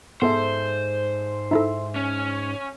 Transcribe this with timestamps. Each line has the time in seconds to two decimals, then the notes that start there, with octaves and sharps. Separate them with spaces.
0.22 G#2 B3 G#4 A4 C5 E5
1.51 D#4 E4 A4 E5
1.96 C#4